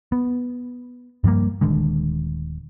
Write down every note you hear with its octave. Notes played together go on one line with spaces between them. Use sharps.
B3
G2 F3 G3 A#3
D#1 D#2 D3 G#3